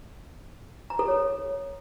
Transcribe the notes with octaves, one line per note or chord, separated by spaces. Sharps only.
A#5
A4
C#5